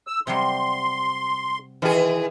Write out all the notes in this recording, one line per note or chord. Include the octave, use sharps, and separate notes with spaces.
E6
C3 F#3 G3 C6
D#3 E3 G#4